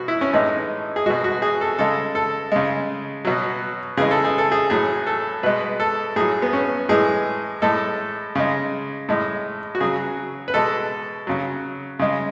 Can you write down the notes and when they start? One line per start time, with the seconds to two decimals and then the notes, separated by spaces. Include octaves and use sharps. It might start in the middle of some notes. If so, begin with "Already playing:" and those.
Already playing: B2 F#4
0.08 E4
0.21 C#4
0.33 A2 E3 G#3 D#4
0.96 G#4
1.06 B2 G#3 F#4
1.24 F#4
1.42 G#4
1.61 A4
1.79 C#3 G#3 A4
2.15 A4
2.52 C#3 G#3
3.25 B2 F#3
3.97 C#3 E3 G#3 G#4
4.11 A4
4.24 G#4
4.38 A4
4.52 G#4
4.70 A2 F#3 G#4
5.07 A4
5.43 B2 G#3 B4
5.80 A4
6.16 A2 F#3 G#4
6.42 B3
6.53 C#4
6.89 A2 E3 G#3 G#4
7.62 A2 G#3 A4
8.35 C#3 G#3
9.09 A2 G#3
9.75 F#4
9.80 C#3 F#3 G#4
10.48 B4
10.54 B2 G#3 A4
11.27 C#3 F#3
11.99 C#3 G#3